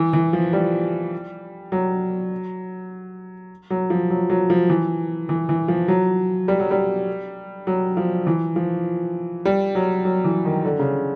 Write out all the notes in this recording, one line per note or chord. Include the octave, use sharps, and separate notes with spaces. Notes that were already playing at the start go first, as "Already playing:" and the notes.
Already playing: E3
E3
F3
G3
F#3
F#3
F3
F#3
F#3
F3
E3
E3
E3
F3
F#3
G3
F#3
G3
F#3
F3
E3
F3
G3
F#3
F#3
E3
D#3
D3
C#3